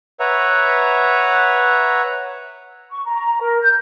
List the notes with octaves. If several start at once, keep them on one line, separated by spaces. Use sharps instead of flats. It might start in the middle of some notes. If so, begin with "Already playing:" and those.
B4 C#5 E5 F#5 A#5
C#6
A#5
A#4
G6